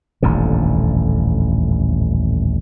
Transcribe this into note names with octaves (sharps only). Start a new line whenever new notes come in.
D#1 A1 F2 D3